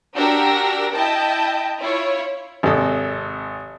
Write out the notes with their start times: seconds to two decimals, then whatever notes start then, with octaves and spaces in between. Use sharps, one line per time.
0.15 D4 F#4 G4 A#4 E6 A#6
0.92 E4 D#5 G5 A5
1.80 E4 F4 C#5
2.63 G#1 C3 A4 D#5